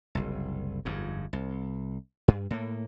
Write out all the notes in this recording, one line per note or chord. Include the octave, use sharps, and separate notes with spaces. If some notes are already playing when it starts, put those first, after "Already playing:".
F#1 C2
G1 F2 G#2
C2
G2
A2 A#3